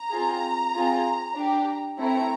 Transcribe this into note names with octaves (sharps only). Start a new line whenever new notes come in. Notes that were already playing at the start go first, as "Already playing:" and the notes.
Already playing: A#5
C4 F4 G#4
C4 F4 G#4
D4 G4
A3 C4 E4 A#5